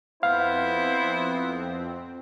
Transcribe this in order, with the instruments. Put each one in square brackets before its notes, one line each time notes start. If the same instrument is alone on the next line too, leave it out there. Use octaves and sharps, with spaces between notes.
[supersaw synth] F2 C4 [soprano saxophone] B3 [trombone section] E4 C5 [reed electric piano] F5